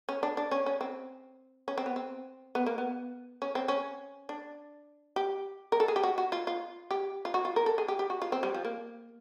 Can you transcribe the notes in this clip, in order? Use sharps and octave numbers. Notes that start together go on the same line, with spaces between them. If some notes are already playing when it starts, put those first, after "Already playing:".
C#4
D4
D4
C#4
C#4
C4
C#4
C4
B3
C4
B3
A#3
B3
C#4
C4
C#4
D4
G4
A#4
A4
G#4
G4
F#4
F#4
F4
F4
G4
F4
F#4
F4
A#4
A4
G#4
G4
G4
F#4
F4
C4
G3
F3
A#3